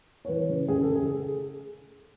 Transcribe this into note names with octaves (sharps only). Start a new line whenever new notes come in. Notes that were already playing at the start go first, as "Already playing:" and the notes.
C#5
E3 B4
C#3
C#3 G#4
A4
C#3
G#4